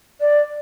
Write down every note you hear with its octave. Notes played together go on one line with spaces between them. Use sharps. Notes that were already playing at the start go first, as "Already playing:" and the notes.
D5